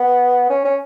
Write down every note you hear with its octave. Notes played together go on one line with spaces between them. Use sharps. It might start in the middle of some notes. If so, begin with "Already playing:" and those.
Already playing: B3
C#4
C#4